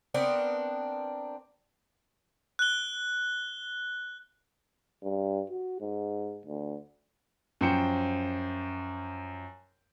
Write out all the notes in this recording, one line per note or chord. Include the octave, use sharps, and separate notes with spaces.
B3 C4 D4 A#4
F#6 G7
G2
F#4
G#2
D2
F#2 F3 C5 G5 C#7